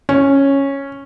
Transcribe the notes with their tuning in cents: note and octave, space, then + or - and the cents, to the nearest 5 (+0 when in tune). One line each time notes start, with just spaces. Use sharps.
C#4 -5